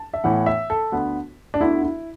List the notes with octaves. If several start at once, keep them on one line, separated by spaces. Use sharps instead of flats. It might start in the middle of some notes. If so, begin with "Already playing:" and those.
Already playing: A5
E5
A2 E3 B3 F#5
E5
A4
D2 D3 B3
D4
D2 D3 B3 E4
E4